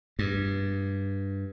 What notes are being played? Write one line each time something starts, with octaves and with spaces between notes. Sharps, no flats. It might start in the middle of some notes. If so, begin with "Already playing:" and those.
G2